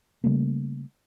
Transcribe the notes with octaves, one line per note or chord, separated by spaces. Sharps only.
C#3 G3 A3 A#3